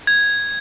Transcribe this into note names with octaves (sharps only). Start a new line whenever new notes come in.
G#6